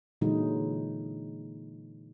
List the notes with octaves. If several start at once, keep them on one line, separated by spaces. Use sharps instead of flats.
A#2 D3 E3 F#3 G#3 D#4